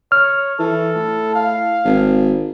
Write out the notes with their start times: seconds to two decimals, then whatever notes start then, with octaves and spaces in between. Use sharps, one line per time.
0.12 C#5 F6
0.60 E3 A4
0.96 A2
1.36 F5
1.85 G#1